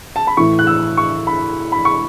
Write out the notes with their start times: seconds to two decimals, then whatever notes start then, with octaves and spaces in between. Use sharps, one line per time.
0.16 A5
0.27 B5
0.37 A2 E3 C#6
0.59 F#6
0.67 E6
0.97 C#6
1.27 B5
1.72 B5
1.85 C#6